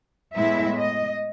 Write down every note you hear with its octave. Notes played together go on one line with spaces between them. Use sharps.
A2 G#3 B3 E4 E5
D#5